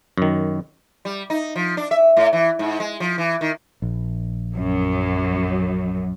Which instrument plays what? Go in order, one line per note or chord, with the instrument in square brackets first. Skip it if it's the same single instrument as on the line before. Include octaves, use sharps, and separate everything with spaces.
[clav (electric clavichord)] F#2 D#3
[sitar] G3
D#4
F3
D4
E5
A2
E3
G#2
G#3
F3
E3
D#3
[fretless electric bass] A#1
[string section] F#2